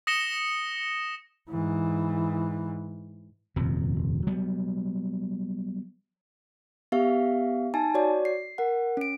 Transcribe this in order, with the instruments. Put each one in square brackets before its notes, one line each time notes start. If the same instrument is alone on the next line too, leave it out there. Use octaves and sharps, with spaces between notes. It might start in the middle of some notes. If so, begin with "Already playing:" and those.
[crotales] D#6 A#6 C#7 E7 G7
[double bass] G#2 E3
[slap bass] D#1 F2 C3
F#3 G3 B3
[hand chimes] B3 G4 E5 F5
D#4 G#5 A5
F#4 C#5 D5
C7
A#4 F#5
C#4 D7